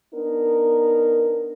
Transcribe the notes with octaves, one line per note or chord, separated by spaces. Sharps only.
B3 D4 D#4 A#4